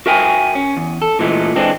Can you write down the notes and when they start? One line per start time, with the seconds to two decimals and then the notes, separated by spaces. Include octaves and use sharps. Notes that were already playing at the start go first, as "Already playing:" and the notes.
0.06 F#4 A#4 E5 G5 G#5
0.55 C#4
0.77 E2
1.02 A4
1.19 A#2 E3 G#3 A3
1.56 E3 G#3 C4 D4